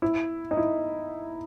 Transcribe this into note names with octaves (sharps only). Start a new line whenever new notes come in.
E4
D#4
E4